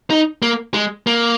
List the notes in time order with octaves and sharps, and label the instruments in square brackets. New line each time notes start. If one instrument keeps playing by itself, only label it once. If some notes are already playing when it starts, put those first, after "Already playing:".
[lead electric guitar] D#4
A#3
G#3
A#3